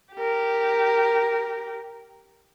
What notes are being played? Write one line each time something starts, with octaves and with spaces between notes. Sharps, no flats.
G4 A#4